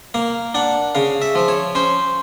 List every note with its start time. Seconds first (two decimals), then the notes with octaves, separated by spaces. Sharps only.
0.14 A#3 F5
0.55 D4 F#5
0.95 C#3 F5
1.22 E5
1.35 F3
1.48 C#5
1.75 C#4 C5